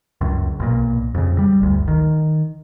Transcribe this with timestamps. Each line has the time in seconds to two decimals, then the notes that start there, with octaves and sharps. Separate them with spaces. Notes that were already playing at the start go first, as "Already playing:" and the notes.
0.21 C#2 F#2
0.60 B1 A#2
1.15 F2 C#3
1.39 G3
1.60 G1 D2
1.88 D#3